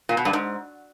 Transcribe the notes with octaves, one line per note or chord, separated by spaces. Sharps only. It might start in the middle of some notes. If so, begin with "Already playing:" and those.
A#2
B2
G2
G#2